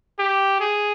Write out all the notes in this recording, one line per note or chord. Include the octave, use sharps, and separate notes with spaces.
G4
G#4